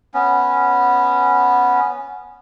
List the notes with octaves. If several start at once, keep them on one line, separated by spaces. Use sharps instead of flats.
B3 C#4